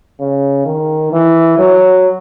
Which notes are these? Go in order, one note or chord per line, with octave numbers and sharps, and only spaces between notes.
C#3
D#3
E3
F#3